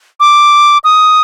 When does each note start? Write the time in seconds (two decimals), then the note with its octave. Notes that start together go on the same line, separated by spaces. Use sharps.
0.20 D6
0.84 D#6